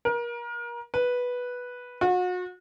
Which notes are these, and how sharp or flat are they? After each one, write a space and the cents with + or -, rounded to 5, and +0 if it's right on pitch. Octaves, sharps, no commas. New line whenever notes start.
A#4 +30
B4 -5
F#4 -35